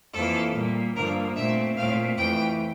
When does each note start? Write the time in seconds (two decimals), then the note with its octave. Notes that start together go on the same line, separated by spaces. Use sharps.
0.13 F2 E3 A#3 A4
0.54 A#2 G3 A#3
0.95 G2 D3 F3 A#3 A#4
1.36 A#2 A3 C4 E5
1.76 A#2 A3 C4 F5
2.17 F2 E3 A3 G5